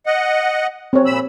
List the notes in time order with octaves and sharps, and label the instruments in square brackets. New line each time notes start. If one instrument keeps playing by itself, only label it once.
[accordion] D#5 F#5
[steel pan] C4 C#5
[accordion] A#2 B5 E6